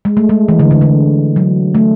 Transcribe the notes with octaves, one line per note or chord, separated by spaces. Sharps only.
G#3
A3
G#3
E3
D3
D3
D3
F#3
A3